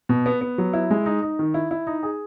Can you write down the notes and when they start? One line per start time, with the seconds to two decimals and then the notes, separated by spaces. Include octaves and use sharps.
0.09 B2
0.26 B3
0.41 B3
0.58 F#3
0.73 E4
0.91 G#3
1.06 D#4
1.23 D#4
1.39 D#3
1.54 E4
1.71 E4
1.87 D#4
2.03 G#4